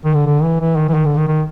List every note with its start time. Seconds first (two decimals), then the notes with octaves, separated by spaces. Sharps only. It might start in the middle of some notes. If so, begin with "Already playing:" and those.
0.05 D#3
0.15 D3
0.26 D3
0.43 E3
0.61 E3
0.77 D#3
0.89 E3
0.94 D#3
1.05 D3
1.17 D#3
1.27 D#3